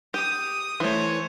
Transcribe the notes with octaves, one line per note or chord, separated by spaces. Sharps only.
G4 G5 D#6
E3 A3 C5 C#5